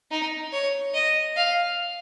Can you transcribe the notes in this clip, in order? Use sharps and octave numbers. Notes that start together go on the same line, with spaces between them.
D#4
C#5
D#5
F5